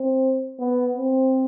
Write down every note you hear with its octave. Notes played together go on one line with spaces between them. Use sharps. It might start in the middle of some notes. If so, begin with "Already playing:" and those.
Already playing: C4
B3
C4